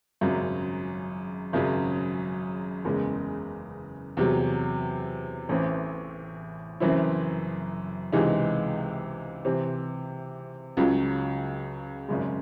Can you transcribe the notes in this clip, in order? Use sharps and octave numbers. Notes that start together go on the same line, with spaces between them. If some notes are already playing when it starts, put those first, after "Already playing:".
G#1 F#2 C#3 F#3
G#1 F#2 C#3 F#3
F#1 E2 C#3 G#3
E2 C3 F#3
A1 A2 E3 C4
F#1 F#2 E3 C4 E4
C#2 C3 E3 G#3 D#4
C3 E3 C4
C#2 C#3 F#3
G#1 F#2 C#3 G#3